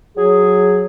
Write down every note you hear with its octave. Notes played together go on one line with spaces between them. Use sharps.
F#3 G#4